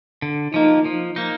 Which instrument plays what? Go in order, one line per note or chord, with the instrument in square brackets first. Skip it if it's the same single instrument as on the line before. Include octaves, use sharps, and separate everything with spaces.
[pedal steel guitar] D3
[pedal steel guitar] F3 A#3 [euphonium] D#4
[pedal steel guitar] F3
A#3 D#4